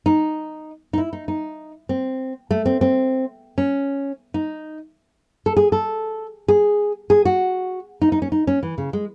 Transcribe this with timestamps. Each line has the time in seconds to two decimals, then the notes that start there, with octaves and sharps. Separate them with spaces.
0.06 D#4
0.93 D#4
0.98 E4
1.13 D#4
1.28 D#4
1.89 C4
2.51 A3
2.66 C4
2.81 C4
3.58 C#4
4.34 D#4
5.46 A4
5.57 G#4
5.72 A4
6.48 G#4
7.10 G#4
7.25 F#4
8.01 D#4
8.12 D#4
8.22 C#4
8.32 D#4
8.47 C#4
8.63 E3
8.78 C#3
8.93 G#3